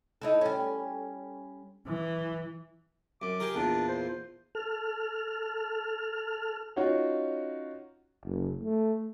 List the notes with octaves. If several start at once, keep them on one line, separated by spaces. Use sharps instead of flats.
D#4 E4 A4
G3 C#4
E3
F#2 D6
G4 G#4 A#4
E2 A#2 D4
C5
A4 F6
C#4 D#4 F4 F#4 C#5
F#1
A3